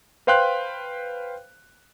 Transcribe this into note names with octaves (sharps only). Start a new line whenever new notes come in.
B4 C5 F5 G5 C6 F#6